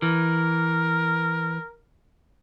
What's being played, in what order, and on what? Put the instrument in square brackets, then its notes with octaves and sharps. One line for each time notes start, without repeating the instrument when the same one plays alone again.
[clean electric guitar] E3 [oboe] A#4